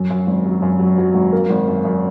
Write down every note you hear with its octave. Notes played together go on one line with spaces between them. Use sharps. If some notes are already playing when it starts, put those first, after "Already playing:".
Already playing: F#2
F#2
G#1
F#3
F#2
F#3
F#3
G#1
A#3
G#1
F#2
F#2